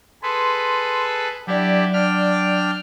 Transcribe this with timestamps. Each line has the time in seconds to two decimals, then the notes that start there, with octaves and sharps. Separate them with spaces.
0.23 G#4 A4 B4 C6
1.47 F#3 D4 E4 G4 D5
1.93 D4 G5 F6